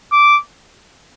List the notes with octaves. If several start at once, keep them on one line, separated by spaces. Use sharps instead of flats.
D6